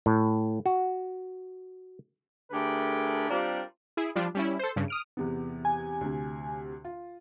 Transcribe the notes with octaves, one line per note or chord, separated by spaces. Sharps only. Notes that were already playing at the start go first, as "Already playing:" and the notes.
A2
F#4
D3 A3 G4 G#4 A#4 B4
G3 C4 D4 F4 G4 A#4
E4 G#4
F3 G3 D4 F4
G3 C#4 E4
A4 C5
G2 C#3
D#6 F6 D7
E2 C3 B3
G#5
D2 C3
F4